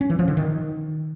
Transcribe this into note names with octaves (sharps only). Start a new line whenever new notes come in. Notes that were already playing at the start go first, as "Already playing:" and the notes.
C#4
E3
F3
D3
D#3